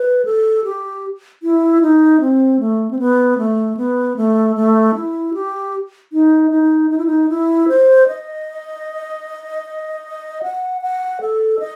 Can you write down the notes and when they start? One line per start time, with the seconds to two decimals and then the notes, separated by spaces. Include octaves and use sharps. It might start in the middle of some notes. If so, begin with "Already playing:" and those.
Already playing: B4
0.25 A4
0.64 G4
1.43 E4
1.82 D#4
2.21 C4
2.60 A3
2.91 C4
2.99 B3
3.38 A3
3.77 B3
4.17 A3
4.56 A3
4.95 E4
5.34 G4
6.13 D#4
6.51 D#4
6.91 D#4
6.98 E4
7.06 D#4
7.30 E4
7.69 C5
8.08 D#5
10.43 F#5
10.82 F#5
11.21 A4
11.59 D#5